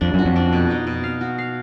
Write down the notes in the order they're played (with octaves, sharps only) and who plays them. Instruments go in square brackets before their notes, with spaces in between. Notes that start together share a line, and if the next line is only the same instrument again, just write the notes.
[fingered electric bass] F2 [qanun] D4
[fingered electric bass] F#2 [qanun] F#4
[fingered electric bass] F2
[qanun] D4
B2
D#4
B2
F5
F#4
F5